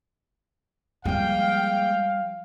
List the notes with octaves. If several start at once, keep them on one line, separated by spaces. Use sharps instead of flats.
F3 G3 G#3 A#3 F5 G5